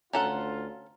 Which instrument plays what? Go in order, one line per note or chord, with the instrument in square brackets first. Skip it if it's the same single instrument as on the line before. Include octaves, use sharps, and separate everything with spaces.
[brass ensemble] D2 F4 [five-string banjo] C#4 A4 F#5 [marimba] A#5